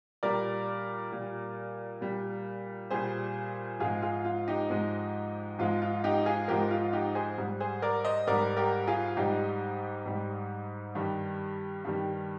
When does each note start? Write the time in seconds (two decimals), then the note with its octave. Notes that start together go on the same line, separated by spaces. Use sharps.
0.23 A#2 G3 A#4 D5
1.12 A#2 G3
2.01 A#2 G3
2.90 A#2 G3 G#4 C5
3.80 G#2 F3 G#3 F4 G#4
4.02 F4 G#4
4.25 F4
4.48 D#4 G4
4.70 G#2 F3 G#3
5.59 G#2 F3 G#3 F4
5.82 F4
6.04 D#4 G4
6.26 F4 G#4
6.48 G#2 F3 G#3 G4 A#4
6.71 F4
6.93 D#4 G4
7.15 G#4 C5
7.38 G#2 G3
7.60 G#4 C5
7.82 A#4 D5
8.05 C5 D#5
8.27 G#2 G3 A#4 D5
8.57 G4 A#4
8.87 F4 G#4
9.17 G#2 G3 D#4 G4
10.06 G#2 G3
10.95 G2 D#3 G3
11.85 G2 D#3 G3